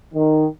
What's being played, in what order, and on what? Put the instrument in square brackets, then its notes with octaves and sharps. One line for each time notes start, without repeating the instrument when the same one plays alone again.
[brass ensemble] D#3